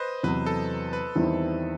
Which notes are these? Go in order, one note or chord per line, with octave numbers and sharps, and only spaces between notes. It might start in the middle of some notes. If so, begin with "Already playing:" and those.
Already playing: B4 C5 D#5
E2 C3 F#3 B3 B4
A4
B4
E2 D#3 G3 C4 E4